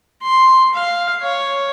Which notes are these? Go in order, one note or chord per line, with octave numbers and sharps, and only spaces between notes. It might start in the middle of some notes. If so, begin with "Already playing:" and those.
C6
F5
C#5